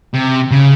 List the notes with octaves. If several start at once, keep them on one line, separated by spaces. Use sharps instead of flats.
C3
C#3